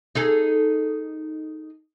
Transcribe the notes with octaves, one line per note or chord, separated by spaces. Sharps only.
D#4 G#4 A4